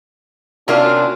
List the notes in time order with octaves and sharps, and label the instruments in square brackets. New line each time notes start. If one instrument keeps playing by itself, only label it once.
[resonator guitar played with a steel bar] C3 A#3 F4 [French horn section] C#4 D4 F#4